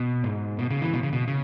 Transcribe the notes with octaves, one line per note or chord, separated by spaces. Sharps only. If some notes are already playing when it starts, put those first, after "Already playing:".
Already playing: B2
G#2
B2
C#3
E3
B2
C#3
B2
C#3